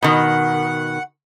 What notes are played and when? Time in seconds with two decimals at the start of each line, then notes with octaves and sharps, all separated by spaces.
0.03 B2 D#3 F#5